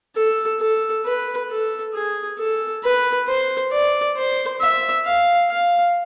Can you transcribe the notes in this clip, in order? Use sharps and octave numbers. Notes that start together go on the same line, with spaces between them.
A4
A4
B4
A4
G#4
A4
B4
C5
D5
C5
E5
F5
F5